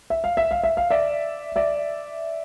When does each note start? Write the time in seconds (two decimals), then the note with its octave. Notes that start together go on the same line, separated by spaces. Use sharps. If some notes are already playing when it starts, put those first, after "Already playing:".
0.10 E5
0.24 F5
0.37 E5
0.51 F5
0.64 E5
0.77 F5
0.91 D5 E5
1.56 D5 E5